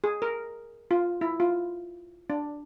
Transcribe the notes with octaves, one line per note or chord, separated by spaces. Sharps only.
G#4
A#4
F4
E4
F4
D4